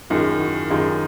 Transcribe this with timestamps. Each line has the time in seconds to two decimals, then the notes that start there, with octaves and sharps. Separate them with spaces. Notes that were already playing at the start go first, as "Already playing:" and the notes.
0.10 F#2 D#3 G#3 D#4 F4
0.40 E4 F#4
0.70 F#2 D#3 G#3 D#4 F4